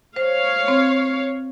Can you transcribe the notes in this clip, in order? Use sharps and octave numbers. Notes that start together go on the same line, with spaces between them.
C5 C#5 F5
C4